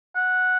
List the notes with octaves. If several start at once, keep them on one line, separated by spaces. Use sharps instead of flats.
F#5